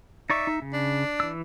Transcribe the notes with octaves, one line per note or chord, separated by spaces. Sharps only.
D#4 D5 E5 C#6
D#4
C#3
D4
E3 E6